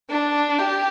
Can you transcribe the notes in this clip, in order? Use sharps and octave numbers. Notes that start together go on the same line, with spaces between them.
D4
G4